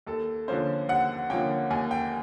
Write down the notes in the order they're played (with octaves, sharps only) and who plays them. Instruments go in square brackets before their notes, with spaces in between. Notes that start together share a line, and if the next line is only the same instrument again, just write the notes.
[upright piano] D#2 A4
D3 F3 A#3 C#4 C5
D#2 F#5
D3 F3 A#3 C#4 G5
D#2 G#5
G5